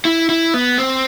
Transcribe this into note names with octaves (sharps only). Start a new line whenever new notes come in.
E4
E4
B3
C4